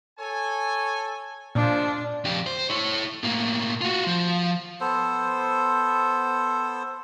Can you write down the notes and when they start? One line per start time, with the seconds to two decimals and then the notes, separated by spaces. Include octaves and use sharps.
0.19 A4 C#5 G#5
1.55 A#2 F3 G#3 D4
2.25 F2 G4
2.47 C5
2.70 E4 C#5
3.23 A2 A#3
3.81 F4 F#4
4.07 F3
4.81 B3 A4 C5